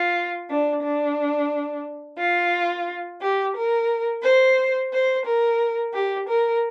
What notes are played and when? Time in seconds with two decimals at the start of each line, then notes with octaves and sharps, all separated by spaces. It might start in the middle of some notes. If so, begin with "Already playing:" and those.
Already playing: F4
0.48 D4
0.83 D4
2.19 F4
3.21 G4
3.55 A#4
4.23 C5
4.92 C5
5.25 A#4
5.94 G4
6.28 A#4